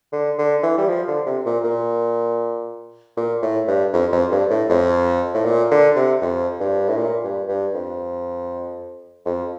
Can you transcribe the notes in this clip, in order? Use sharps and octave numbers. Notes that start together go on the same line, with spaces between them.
D3
D3
E3
G3
F3
D3
C3
A#2
A#2
A#2
A2
G2
F2
F2
G2
A2
F2
A2
A#2
D3
C3
F2
G2
A2
A#2
G2
G2
F2
F2